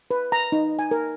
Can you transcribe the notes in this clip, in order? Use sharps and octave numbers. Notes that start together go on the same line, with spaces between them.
B4
A#5
D#4
G#5
A#4